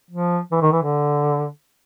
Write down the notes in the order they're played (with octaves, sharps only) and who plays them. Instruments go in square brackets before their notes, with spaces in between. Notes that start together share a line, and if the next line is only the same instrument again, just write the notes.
[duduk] F3
E3
D#3
E3
D3